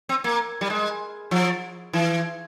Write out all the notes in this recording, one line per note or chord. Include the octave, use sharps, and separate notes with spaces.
C4
A#3
G3
G#3
F3
E3